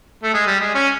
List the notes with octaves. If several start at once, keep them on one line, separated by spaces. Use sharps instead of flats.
A3
G#3
G3
G#3
C#4